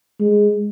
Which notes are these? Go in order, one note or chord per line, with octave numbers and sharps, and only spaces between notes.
G#3